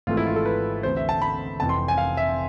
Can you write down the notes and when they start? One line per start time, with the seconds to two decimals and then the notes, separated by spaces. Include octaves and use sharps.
0.07 G#1 G#2 E3 A3 F4
0.17 E4
0.26 F4
0.36 A4
0.45 B4
0.83 D2 C3 E3 A3 C5
0.97 E5
1.09 A5
1.22 B5
1.60 F1 F2 E3 A5
1.69 C6
1.88 G#5
1.98 F5
2.17 E5